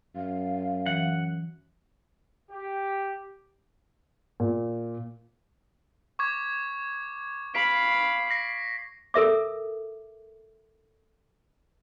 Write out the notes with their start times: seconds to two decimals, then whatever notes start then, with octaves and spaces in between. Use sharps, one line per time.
0.16 F#2 F5
0.86 E3 F#5
2.51 G4
4.40 A#2
6.19 C#6 D6 G#6
7.55 F5 B5 B6 D7
8.30 A#6 C7
9.14 A4 A#4 E5 D6